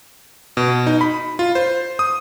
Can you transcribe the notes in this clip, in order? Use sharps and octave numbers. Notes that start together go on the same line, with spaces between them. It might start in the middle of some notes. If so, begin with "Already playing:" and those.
B2
D#4
B5
F4
C5
D#6